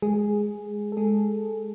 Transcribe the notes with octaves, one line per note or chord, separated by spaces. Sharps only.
G#3 G#4
A4
G#3 G#4